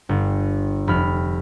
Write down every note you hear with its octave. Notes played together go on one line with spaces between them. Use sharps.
G1
F1 B5 F6